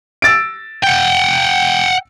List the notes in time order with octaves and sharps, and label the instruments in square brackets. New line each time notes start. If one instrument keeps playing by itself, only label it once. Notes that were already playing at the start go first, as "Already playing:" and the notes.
[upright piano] E6 A6 D7
[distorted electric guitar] F#5 G5